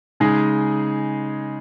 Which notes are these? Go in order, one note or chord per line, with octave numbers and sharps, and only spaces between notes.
C#3 G#3 D#4 G#4